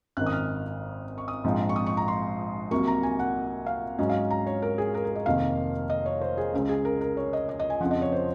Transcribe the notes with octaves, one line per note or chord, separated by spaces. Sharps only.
G#1 F#2 D#3 F#6
D#6
F6
C#6
D#6
A#1 G#2 F3 C4
C#6
D#6
C#6
A#5
C6
C2 C3 F#3 A#3 C#6
A#5
G#5
F#5
F5
G#2 F#3 C#4 D#5
F5
A#5
C#5
A#4
G#4
A#4
A#4
D#5
F1 F2 D#3 A#3 F5
D#5
C#5
C5
G#4
C#2 C#3 G#3
G#4
A#4
A#4
C#5
D#5
D#5
D#5
G#5
F2 C#3 F3 F#5
D#5
C#5
C5